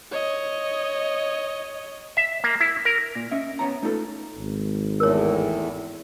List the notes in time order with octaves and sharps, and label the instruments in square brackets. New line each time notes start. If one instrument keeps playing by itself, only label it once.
[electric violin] C#5 D#5
[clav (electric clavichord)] E5
A#3
E4
A#4
[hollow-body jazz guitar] A#2
C#4 D#5 E5
B3 C#4 C#5 A#5
A3 D#4 F4 G4 A4 B4
[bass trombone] G#1
[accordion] E2 A2 [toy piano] A#4 C#5